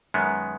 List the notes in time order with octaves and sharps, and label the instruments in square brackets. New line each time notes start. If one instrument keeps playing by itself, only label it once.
[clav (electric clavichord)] F#2 D#3 G#3 B3